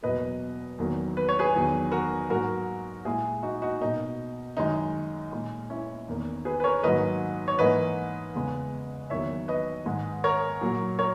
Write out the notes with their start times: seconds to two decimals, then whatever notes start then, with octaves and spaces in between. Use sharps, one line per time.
0.03 E2 B2 F#3 A#3 B4 D#5
0.78 E2 D#3 F#3 A#3
1.17 B4
1.29 C#5
1.39 G#4 B4
1.54 E2 D#3 F#3
1.92 F#4 A#4
2.30 G#2 F#3 A#3 F#4 A#4
3.05 A#2 G#3 E4 G#4
3.43 D#4 F#4
3.62 D#4 F#4
3.81 B2 A#3 D#4
4.57 F#2 D#3 G#3 D#4
5.32 A#2 G#3
5.70 C#4 E4
6.08 E2 D#3 A#3
6.45 G#4 B4
6.60 B4
6.64 A#4 C#5
6.83 G#2 D#3 F#3 A#3 B4 D#5
7.48 C#5
7.59 G#2 E3 A#3 B4 D#5
8.35 E2 C#3 G#3
9.10 E2 D#3 F#3 A#3 C#5 E5
9.48 B4 D#5
9.86 G#2 D#3 G#3
10.24 A#4 C#5
10.61 A#2 F#3 A#3
10.99 A#4 C#5